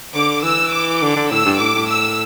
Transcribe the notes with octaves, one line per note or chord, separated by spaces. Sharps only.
D3 D6
E3 E6
D6
D3
D3
A2 E6
G2
A2 D6
A2
E6